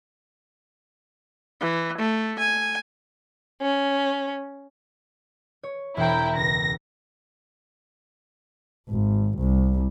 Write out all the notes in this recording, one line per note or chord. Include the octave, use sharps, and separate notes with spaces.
E3
A3
G#5
C#4
C#5
E1 E4 C5 G5 A#5
C#2 A#6
G#1
C2